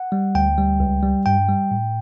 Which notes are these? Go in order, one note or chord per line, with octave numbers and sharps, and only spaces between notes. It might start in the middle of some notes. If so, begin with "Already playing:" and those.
Already playing: F#5
G3
D2 G5
G3
C#2
G3
G2 G5
G3
A2